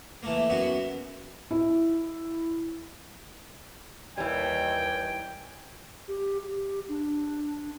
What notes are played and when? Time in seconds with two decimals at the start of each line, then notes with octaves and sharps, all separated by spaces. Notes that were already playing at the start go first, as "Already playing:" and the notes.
0.23 E3 A3 A#3
0.49 F#2 B3 E4 F#4
1.51 E4
4.18 D#2 E3 G3 G5 G#5
6.08 G4
6.43 G4
6.89 D4